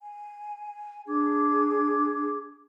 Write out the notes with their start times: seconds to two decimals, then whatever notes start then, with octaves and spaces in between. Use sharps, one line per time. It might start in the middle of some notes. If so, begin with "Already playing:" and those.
0.02 G#5
1.08 D4 G#4 D6 G#6